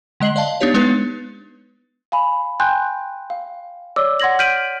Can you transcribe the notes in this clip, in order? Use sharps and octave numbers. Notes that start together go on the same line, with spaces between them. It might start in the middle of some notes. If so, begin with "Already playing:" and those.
D3 G#3 D#5 C7 F#7
D5 D#5 F5 A5
B3 D4 D#4 G4 C#5
G#3 B3 D4 D#4 B4
F5 G#5 B5
G5 G#5 C6 F#6 G6
F5
C#5 D5 D6 E6
F#5 C6 G#6 A#6 F#7
F6 G6 B6 D7 D#7 F#7